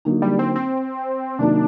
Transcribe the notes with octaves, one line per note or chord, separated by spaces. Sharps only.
D3 F#3 A#3 D#4
G3
C4
C4
C3 D#3 F#3 A#3 D4 D#4